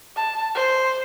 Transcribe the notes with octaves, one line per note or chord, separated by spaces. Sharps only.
A5
C5